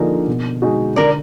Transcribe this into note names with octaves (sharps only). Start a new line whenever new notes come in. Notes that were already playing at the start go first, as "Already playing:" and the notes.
Already playing: D3 F3 A#3 D#4 G#4 A#4
B2
G#3 D#4 F#4
D3 A#4 D5